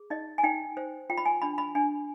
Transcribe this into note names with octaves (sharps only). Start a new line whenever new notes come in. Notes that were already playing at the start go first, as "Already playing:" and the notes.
Already playing: G#4
D#4 D#5
G#5
D#4 G5
C5
F4 G5
B5
G#5
D4 B5
B5
D4 G#5